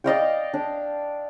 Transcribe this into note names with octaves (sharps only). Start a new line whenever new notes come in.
D5 D#5 F5 G5
D4